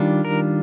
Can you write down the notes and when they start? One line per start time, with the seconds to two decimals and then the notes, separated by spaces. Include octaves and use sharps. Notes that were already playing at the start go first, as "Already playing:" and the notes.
Already playing: D#3 G3 D4 F4
0.25 A#4